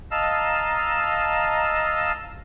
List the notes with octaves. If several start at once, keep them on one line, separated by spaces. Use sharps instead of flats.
D#5 F5 A5 A#5 E6